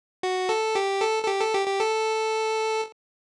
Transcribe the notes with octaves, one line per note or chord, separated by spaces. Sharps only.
F#4
A4
G4
A4
A4
G4
A4
G4
G4
A4